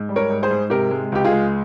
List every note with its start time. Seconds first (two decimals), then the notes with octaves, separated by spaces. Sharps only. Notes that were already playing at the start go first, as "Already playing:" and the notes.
Already playing: G#2
0.09 G3
0.16 A#4 C#5
0.30 G#2
0.43 G#4 C5
0.51 G#2
0.70 C3 G4 A#4
0.91 G#3
1.12 C#2 G4
1.25 F4 G#4
1.32 G#3